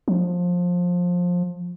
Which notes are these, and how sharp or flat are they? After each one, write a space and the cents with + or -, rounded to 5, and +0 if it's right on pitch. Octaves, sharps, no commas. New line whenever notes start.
F3 +20